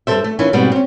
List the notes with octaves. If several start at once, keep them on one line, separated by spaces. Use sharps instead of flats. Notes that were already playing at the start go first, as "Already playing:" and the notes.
G2 E3 A4 C5 E5
A3
D#3 E3 C#4 E4 F4
G#2 B2 G3 B3 C4
C4 C#4